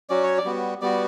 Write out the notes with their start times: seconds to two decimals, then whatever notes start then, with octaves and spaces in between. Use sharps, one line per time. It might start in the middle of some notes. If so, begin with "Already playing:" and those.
0.09 F#3 C#4 F#4 D5
0.23 C#5
0.38 D5
0.45 G3 B3 F#4
0.82 G3 B3 F#4 D5